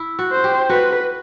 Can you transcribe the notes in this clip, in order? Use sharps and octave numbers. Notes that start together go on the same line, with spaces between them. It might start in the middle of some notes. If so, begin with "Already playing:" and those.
Already playing: E4
F#4
C5
G4
F#4 B4